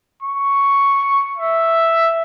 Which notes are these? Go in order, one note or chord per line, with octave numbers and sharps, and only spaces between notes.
C#6
E5